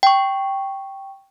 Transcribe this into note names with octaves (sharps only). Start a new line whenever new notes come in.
G5 C#6